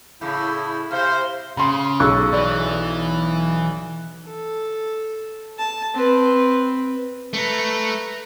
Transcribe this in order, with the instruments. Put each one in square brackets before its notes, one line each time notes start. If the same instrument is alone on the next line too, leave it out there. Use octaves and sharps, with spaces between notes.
[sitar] A2 C#3 [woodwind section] E4
[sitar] C3 [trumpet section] C5 [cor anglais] F5
[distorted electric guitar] C#3 [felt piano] B5 C6
[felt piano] B1 C#6 [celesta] G#4 E6 F#6
[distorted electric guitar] E3 [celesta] D5
[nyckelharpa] A4
A5
C4 B4
[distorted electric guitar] A3 [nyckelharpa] B4 A#5